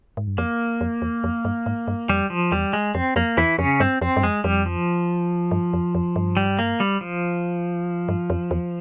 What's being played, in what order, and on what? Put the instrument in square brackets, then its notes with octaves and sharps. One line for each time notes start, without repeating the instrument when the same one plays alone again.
[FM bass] G#2
G2
[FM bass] F2 [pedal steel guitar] A#3
[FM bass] F2
E2
F2
G2
G#2
G2
[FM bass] F2 [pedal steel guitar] G3
[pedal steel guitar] F3
[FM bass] E2 [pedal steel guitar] G3
[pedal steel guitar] G#3
[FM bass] F2 [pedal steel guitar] C4
[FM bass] F2 [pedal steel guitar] A#3
[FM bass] E2 [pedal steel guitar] E3 E4
[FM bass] F2 [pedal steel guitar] C#3 C#4
[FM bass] G2 [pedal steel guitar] C4
[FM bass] F2 [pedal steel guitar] C4
[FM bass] G2
[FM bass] F2 [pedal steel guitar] G#3
[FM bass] F2 [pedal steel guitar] G3
[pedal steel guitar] F3
[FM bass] G2
F2
F2
G2
[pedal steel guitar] G3
A#3
G3
F3
[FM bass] G2
F2
E2